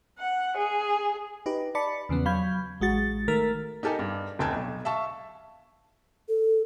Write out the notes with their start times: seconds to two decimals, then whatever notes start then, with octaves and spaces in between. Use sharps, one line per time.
0.18 F#5
0.57 G#4
1.46 D#4 G4 B4
1.75 D5 A5 B5 C#7
2.09 E2 C#3 F3 B3
2.26 F#3 F5 B5 G6 G#6
2.81 A1 G#3 F#4 A6
3.28 D#3 A3 A#4 F6 A6 B6
3.83 D#4 G4 A4 A#4 G#5
3.99 G2
4.39 F1 D2 G5 A5 G#6
4.53 B1
4.85 E5 F5 A5 C#6
6.29 A4